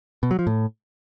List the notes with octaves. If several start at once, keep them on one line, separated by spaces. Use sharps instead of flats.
B2
F#3
F3
A2